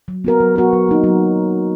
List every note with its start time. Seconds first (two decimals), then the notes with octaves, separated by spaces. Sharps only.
0.08 F#3
0.24 B3 F#4 A#4
0.40 F#3
0.56 B3 F#4 A#4
0.73 F#3
0.89 A#3 D#4
1.04 F#3